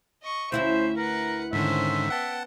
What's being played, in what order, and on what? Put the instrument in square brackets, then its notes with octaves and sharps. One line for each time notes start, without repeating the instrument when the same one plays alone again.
[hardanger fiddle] D#5 C#6
[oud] D2 E4 F#4 [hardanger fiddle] C#4 E5 [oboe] C5
[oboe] A#4 [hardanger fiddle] B4 F#5
[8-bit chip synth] G#2 D3 D#3 [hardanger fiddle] C#4 C5 [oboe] E5
[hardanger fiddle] B3 G5 [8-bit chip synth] F#5 A5